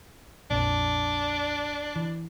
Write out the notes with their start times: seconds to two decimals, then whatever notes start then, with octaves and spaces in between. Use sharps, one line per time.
0.51 A#1 F2 D4
1.96 E3